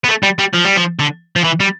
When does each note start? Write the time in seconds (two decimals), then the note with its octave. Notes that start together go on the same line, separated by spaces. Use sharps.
0.04 B3
0.09 A3
0.23 G3
0.39 G3
0.53 F3
0.64 G3
0.76 F3
0.99 D3
1.36 F3
1.44 E3
1.60 G3